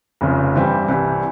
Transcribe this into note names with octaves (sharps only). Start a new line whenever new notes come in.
F1 F2 C#3 F3
G2 E3 G3 C4 G4
C2 C3 E3 G3